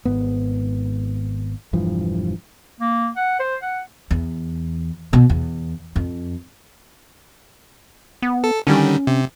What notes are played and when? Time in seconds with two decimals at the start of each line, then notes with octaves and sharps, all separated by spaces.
0.05 G#1 G#2 B3
1.73 E1 G2 E3 F3
2.80 A#3
3.16 F#5
3.40 C5
3.62 F#5
4.11 E2
5.13 B2
5.30 E2
5.96 F2
8.22 B3
8.44 A4
8.67 D3 D#3 G3 C#4
9.07 C3